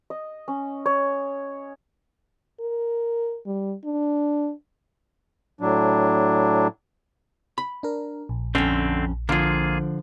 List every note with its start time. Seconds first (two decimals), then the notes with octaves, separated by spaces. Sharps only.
0.10 D#5
0.48 C#4
0.86 C#5
2.60 A#4
3.46 G3
3.84 D4
5.61 A2 F#3 D4
7.58 B5
7.83 D4 A#4
8.29 A#1
8.55 F2 D3 A3 C4 C#4
9.29 D3 F3 A#3 F4 G#4